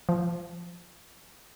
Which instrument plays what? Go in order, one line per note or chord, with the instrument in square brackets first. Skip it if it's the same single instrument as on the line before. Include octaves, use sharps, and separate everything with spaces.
[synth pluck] F3